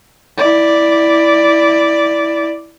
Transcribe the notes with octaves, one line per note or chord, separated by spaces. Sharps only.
E4 D5